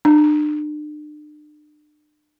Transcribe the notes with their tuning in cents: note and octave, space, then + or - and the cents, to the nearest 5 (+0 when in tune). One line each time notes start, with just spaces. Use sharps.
D4 +40